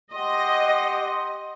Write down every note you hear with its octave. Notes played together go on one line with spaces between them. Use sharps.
G4 D#5 F#5 C6